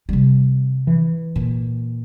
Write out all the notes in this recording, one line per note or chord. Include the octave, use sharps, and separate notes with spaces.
C3 G3
E3
A#2